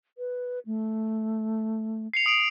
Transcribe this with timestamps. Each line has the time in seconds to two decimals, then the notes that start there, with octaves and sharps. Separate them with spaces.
0.18 B4
0.66 A3
2.13 C7 C#7 F7
2.26 D#6 D7 F7